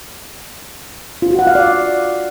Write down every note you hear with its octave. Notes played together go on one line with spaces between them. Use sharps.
F4
F#4
F#5
F5
D5